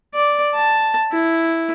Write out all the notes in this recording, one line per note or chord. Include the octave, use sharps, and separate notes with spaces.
D5
A5
E4